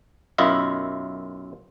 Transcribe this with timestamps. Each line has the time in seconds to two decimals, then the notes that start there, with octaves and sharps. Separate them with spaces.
0.38 B1 F#2 E4 F4 D#5 E5